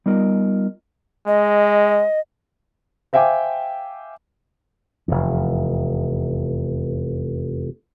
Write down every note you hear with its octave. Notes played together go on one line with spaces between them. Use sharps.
G3 B3 D#4 F4 A#4 D#5
G#3 D#5
C5 E5 F5 G5 G#5 D6
F1 E2